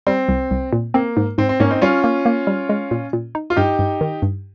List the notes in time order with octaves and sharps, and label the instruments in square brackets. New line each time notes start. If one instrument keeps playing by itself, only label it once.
[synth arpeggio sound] G3 [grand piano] C4
[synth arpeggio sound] C2
C2
A#2
[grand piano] A#3 [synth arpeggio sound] C4
[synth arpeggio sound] G#2
[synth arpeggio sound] G#2 [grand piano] C4
[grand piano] C4
[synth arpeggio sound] G#2 [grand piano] A#3 C#4
[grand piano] C4 D#4
[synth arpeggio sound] G3 [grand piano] C#4 F4
[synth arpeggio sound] A#3
A#3
G3
G#3
A#2
A#2
D#4
[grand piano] F4
[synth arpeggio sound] G2 [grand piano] D#4 G4
[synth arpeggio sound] G2
D#3
G2